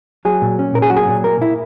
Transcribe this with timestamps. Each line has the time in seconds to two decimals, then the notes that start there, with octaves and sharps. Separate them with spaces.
0.25 F#3 G#4
0.42 A#2
0.59 C#4
0.75 A#2 A#4
0.82 G#4
0.90 F#3 F#4
0.97 G#4
1.08 A#2
1.24 A#3 A#4
1.41 A#2 E4